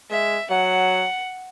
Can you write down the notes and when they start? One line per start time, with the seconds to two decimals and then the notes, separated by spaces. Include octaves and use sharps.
0.10 G#3 E5
0.50 F#3 F#5